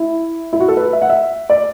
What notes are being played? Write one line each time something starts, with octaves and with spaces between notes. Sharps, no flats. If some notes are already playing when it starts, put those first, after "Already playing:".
Already playing: E4
E4
F#4
A4
B4
E5
F#5
E5
D5